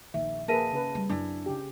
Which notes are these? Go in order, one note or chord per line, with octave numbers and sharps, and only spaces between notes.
A#1 D#3 E5
A#3 G#4 A#4 B4 E5 A5 A#6 D#7
C#3 B4
G3
F#2 C4 D4 E4 G#5
C#3 G4